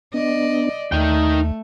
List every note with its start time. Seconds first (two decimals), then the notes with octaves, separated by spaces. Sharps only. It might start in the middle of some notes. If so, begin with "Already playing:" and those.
0.14 B3 D4 D5 D#5
0.92 D#2 A3 D#4 G5